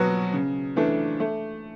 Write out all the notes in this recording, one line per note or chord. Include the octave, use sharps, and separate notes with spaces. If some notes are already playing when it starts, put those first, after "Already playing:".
Already playing: B2 F#3 B3 F#4
C#3
E3 A3 D4
A3